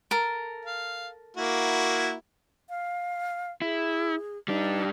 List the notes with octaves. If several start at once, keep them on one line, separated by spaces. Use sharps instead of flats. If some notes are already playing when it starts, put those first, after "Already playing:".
A4 A#4
F5
A#3 E4 F#4
F5
E4 G#4
G3 D4 D#4